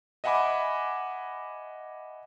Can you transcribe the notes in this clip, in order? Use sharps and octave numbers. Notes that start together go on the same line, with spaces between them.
D#5 E5 F#5 G#5 B5 D6